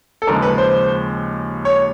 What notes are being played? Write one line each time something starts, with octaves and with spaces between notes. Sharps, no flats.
A4
D#2 C#3 F3 G#3 A#4
B4
C5
C#5